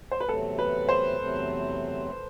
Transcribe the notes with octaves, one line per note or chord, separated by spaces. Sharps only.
C5
B4
E2 C3 F#3 A3 C4 A4
B4
C5
E2 C3 F#3 A3 C4